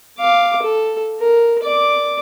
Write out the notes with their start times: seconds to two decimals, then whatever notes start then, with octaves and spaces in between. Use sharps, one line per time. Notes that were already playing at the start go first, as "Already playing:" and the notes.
0.18 F5 D6
0.62 A4
1.20 A#4
1.63 D5 D6